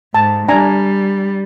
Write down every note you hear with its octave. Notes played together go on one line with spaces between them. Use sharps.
G#2 A5
G3 D4 G#5 A#5